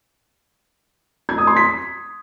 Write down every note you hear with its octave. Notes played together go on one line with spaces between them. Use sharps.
G#6
D#6
C6
B6